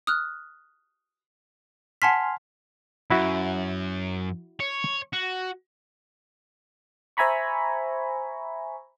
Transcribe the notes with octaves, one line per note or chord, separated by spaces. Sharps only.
D#6 F6 F#6
F#5 G#5 A5 C6 F6 B6
F#2 E4 F#4 E5
C#5
F#4
C5 E5 G#5 A#5 B5 C#6